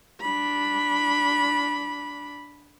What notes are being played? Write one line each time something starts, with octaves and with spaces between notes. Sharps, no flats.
D4 B5